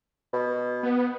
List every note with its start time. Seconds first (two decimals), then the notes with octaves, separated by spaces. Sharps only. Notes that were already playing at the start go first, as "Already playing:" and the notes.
0.33 B2
0.83 B3